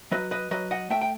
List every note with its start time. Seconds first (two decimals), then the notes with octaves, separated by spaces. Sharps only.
0.11 F#3 B4 D#5
0.31 B4 D#5
0.51 F#3 B4 D#5
0.71 D#5 F#5
0.90 A3 E5 G5
1.01 G5